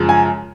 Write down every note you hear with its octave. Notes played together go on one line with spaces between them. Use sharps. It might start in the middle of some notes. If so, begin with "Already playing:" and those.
Already playing: F#2 C#3 F3 G#3
G#5